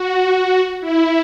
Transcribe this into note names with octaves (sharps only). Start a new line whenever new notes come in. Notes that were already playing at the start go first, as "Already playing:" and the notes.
Already playing: F#4
F#4
E4